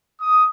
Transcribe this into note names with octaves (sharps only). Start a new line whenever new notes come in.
D#6